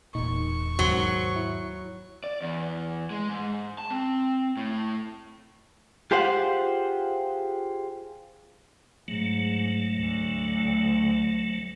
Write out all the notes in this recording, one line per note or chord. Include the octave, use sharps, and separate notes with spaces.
E1 A#2 D#4 C#6
D#2 G#2 B2 D#3 F#3 C5
E4
D5
E2
G#3
G#2
A5
C4
A2
F4 G4 G#4 C5 F5 F#5
G#2 F#3 A3
D2